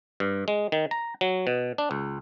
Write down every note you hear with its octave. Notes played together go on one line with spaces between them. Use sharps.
G2
G#3
D#3
A#5
F#3
B2
D4
C#2